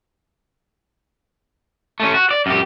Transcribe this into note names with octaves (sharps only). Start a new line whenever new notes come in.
A3 C#4
F#4
D5
F#2 G4